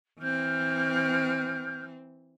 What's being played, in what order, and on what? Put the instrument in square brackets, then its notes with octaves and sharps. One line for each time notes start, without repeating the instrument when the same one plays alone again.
[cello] E3 C4 [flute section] F6 G6